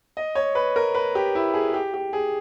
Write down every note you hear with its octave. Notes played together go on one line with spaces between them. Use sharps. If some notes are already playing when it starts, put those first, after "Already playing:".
D#5
C#5
B4
A#4
B4
G4
E4
G#4
G4
G4
G#4